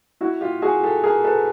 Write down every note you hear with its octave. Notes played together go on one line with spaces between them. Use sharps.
E4 F#4
F4 G4
F#4 G#4
G4 A4
G#4 A#4
A4 B4